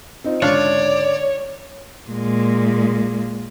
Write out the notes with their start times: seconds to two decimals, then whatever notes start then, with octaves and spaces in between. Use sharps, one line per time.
0.24 C4 D#4 F4
0.42 C#2 G#2 D3 D4 F4 C#5 D5
2.11 A#2 G#3